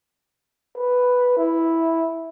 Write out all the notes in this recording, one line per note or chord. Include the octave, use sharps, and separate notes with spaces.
B4
E4